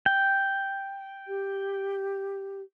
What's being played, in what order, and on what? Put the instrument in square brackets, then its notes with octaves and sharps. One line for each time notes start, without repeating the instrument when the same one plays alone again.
[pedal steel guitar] G5
[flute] G4